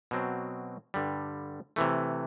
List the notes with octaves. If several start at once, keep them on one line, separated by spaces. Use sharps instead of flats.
B2 F#3 C4
G2 D3 G3
C3 E3 A3